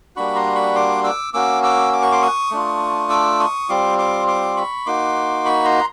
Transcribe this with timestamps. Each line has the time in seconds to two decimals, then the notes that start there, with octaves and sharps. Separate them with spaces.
0.16 G3 A#3 D4 F#4 B5 C#6
0.35 A#5 C6
0.55 B5 C#6
0.75 C6 D6
1.04 D6 E6
1.34 A#3 C#4 F#4 D6 E6
1.63 D6 E6
1.93 D6
2.02 C#6
2.12 C6 D6
2.22 C#6 D#6
2.51 A3 D4 F4
3.10 D6 E6
3.40 C#6 D#6
3.69 G3 C4 F4 C6 D6
3.98 C6 D6
4.27 C6 D6
4.56 B5 C#6
4.86 A#3 D#4 F#4 C6 D6
5.45 B5 C#6
5.65 A#5 C6